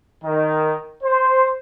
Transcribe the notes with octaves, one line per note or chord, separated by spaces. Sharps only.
D#3
C5